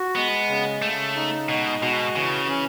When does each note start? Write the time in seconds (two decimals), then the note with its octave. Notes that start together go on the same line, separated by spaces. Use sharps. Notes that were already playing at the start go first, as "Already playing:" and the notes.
Already playing: F#4
0.15 G#3 B3
0.49 C#3
0.82 C#3 A3
1.16 D#4
1.49 B2 G#3
1.82 B2 F#4
2.16 C#3 E3
2.48 C#4